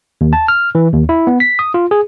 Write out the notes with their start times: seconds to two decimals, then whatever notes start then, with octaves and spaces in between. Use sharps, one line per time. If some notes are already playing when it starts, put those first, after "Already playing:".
0.21 D#2
0.33 A5
0.48 F6
0.75 E3
0.93 D#2
1.09 E4
1.27 B3
1.40 B6
1.59 D#6
1.74 F4
1.91 G#4